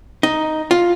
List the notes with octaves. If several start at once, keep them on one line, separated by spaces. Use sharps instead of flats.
D#4
F4